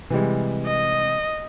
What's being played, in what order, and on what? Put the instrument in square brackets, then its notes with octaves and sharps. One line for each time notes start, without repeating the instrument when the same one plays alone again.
[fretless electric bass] C3 [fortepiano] E3 G3 G#3
[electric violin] D#5